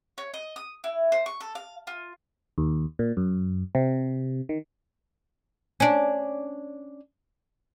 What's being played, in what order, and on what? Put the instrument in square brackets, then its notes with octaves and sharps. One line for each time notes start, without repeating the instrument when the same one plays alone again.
[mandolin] C#5
D#5
D#6
E4
C5
C#6
A4
F5
F4
[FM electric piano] D#2
A#2
F#2
C3
D#3
[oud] C#4 D4